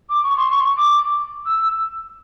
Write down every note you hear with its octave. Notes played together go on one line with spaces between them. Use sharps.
D6
C#6
C6
C#6
D6
E6